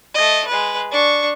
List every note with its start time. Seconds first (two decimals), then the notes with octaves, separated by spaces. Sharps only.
0.15 A3 D#5
0.47 G#3 B4
0.91 D4 C#6